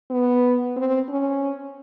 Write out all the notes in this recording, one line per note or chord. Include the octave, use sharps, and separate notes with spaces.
B3
C4
C#4